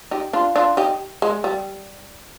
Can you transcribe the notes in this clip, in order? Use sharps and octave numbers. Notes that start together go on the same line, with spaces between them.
D#4 G4
D4 F4
D4 F4
D#4 G4
G#3
G3